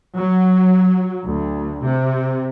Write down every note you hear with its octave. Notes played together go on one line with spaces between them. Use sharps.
F#3
D2
C3